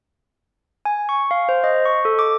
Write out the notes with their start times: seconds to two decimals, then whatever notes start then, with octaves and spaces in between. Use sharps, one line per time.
0.85 G#5
1.09 C#6
1.31 F5
1.49 C5
1.64 D#5
1.85 C#6
2.05 A4
2.19 D6